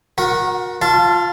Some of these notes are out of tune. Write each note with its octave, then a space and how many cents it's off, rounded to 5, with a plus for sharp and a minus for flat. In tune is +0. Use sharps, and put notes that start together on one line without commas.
F#4 -30 A#4 +20 F#5 +0
F4 +10 F5 -35 A5 +0